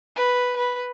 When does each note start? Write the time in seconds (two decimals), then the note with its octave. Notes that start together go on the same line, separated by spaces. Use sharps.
0.16 B4
0.57 B4